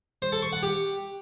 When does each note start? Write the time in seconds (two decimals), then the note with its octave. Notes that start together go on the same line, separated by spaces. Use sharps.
0.22 C5
0.32 A4
0.42 C#6
0.53 F#5
0.63 G4